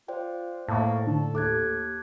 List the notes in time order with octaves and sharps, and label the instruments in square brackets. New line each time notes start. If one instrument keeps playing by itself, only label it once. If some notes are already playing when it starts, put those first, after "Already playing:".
[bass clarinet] F4 [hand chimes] C5 D5 G5
[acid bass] A2 [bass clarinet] A#3 [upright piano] A5 C#6
[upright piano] D3 [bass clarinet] A4
[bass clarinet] D#2 [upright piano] A4 A5 [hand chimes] D6 F#6 G#6